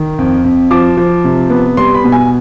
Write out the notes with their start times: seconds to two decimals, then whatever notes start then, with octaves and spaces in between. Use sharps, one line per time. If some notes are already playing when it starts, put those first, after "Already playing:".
Already playing: D#3
0.18 F2
0.44 F2
0.71 F3 D6
0.97 F3
1.24 C3
1.50 B3
1.77 G3 C6
1.94 B5
2.04 B2
2.12 G#5